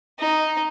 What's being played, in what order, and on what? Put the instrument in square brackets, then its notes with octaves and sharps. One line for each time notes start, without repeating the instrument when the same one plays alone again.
[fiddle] D#4